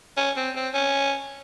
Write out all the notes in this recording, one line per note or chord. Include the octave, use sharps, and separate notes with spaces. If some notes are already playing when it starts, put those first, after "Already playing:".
C#4
C4
C4
C#4